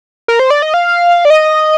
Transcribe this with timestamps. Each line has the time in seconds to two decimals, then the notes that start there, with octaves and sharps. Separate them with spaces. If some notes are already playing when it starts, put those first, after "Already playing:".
0.28 A#4
0.39 C5
0.50 D5
0.62 D#5
0.74 F5
1.25 D5
1.30 D#5